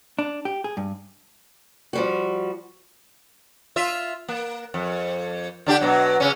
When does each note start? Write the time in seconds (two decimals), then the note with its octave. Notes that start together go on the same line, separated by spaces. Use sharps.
0.19 D4
0.45 G4
0.64 G#4
0.77 G2
1.93 F3 G3 F#4
3.76 F4 E5
4.28 A#3
4.74 F2
5.66 D3 D4 G4
5.81 B2 F#3
6.20 C#3 C#4